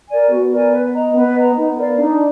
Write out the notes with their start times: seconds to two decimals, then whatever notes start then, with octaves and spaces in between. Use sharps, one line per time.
0.09 A#4 D5 G#5
0.30 B3 F#4
0.51 A#4 D5 G#5
0.72 B4
0.94 D#5 A#5
1.14 B3 B4
1.36 D#5 A#5
1.56 B3 D#4
1.77 A#4 D5 F5
1.98 D4 D#4